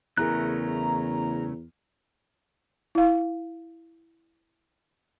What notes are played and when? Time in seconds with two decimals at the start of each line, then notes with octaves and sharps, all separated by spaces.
0.17 E2 C#3 A3 E4 G#4 A#4 A#5 F#6
2.95 E4 F5